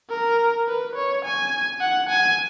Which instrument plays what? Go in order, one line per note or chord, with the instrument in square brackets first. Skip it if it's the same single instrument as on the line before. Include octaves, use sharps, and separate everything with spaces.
[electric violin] A#4
B4
C#5
G#5
F#5
G#5